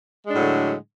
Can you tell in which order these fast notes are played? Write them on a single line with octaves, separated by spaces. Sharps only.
G#3 D4 A2 F#3 D3